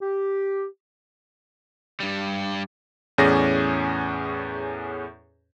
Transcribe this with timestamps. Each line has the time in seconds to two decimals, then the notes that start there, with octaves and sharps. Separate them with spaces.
0.01 G4
2.00 G2 G3
3.18 E2 A2 C#4 G#4 D5 A#6